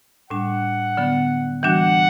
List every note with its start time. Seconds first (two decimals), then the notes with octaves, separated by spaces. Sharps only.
0.30 A2 G3 D4 F#5
0.97 D3 F#3 B3
1.63 E3 G3 D4 F#4 F#5